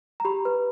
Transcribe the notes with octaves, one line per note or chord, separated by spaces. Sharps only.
A#5
G4 B5
B4